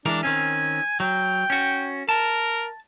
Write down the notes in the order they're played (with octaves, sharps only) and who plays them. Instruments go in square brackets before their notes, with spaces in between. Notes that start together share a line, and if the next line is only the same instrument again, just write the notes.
[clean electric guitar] E3 G#3 A#4 [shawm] D4
[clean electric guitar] D#3 C4 C#4 [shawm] G#5
[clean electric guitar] F#3 [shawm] G5
[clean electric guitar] C#4 F#4
[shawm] A#4 [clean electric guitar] A5